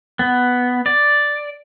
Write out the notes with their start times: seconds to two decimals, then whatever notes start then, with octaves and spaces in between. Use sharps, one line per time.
0.19 B3
0.86 D5